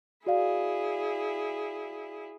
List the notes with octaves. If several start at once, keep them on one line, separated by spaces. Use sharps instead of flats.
E4 F#4 G#4 D5 F5